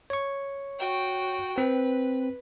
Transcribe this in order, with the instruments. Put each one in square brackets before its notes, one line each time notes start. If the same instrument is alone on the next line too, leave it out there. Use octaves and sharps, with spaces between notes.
[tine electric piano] C#5 C#6
[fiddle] F#4 G5
[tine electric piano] C4 [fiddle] B4